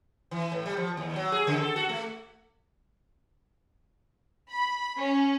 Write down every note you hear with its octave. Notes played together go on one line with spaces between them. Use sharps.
E3
A2
G3
F3
D#2
F#3
G#4
C#3
A4
F#4
A3
B5
C#4